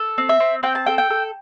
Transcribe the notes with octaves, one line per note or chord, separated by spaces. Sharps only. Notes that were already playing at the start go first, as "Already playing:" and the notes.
Already playing: A4
C4
E5
C4
C4 G5
A5
A4 G5
G5
A4